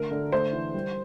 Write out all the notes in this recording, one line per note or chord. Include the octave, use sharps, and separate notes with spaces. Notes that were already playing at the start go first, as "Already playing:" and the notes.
Already playing: D3 A3 A#4
D3
A3 C5
E3
G3